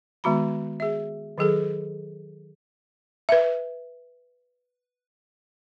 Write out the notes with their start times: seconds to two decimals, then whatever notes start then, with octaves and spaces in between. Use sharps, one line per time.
0.24 D#3 G#3 B3 F#4 A#5 B5
0.80 G#4 E5
1.38 D#3 F#3 G#4 A4
3.29 B4 E5